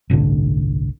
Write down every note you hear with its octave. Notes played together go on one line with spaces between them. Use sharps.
G1 C2 A2 D3